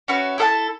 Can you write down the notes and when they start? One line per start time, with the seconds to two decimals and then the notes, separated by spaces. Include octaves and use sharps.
0.08 C#4 F#4 B4 E5
0.38 E4 A4 E5 A5